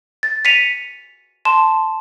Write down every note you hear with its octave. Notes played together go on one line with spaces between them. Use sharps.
A6
B6 C#7 D#7 F7
A5 C6 E7